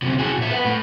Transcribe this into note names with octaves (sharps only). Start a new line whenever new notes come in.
D2 C3
F#4 G#4
A#2 E5
B4 F#5
A2